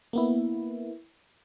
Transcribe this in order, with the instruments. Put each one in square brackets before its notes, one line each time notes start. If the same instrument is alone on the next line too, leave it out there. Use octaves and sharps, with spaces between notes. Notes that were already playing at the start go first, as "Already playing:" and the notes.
[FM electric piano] A#3 B3 E4